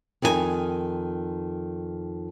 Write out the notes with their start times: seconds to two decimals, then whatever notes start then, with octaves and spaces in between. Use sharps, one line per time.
0.22 F2 D#3 D#4 F4 G#5